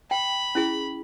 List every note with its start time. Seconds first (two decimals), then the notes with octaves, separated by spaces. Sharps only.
0.11 G5 B5
0.55 C#4 E4 G#4